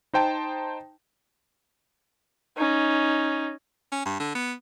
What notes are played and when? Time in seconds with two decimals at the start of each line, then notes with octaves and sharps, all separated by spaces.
0.13 D#4 C5 G5 A5
2.57 C#4 D#4
3.92 C#4
4.05 G2
4.20 D3
4.35 B3